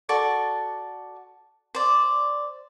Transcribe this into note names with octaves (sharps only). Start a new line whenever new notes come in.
F#4 A4 D5 C#6
C5 D5